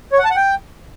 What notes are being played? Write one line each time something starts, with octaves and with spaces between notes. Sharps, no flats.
C#5
F#5
A5
F#5
G5